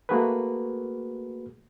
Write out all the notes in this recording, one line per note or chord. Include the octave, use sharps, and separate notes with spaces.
A3 A#3 F#4 G#4 A#4 B4